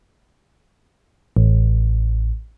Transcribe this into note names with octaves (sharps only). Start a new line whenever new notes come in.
A1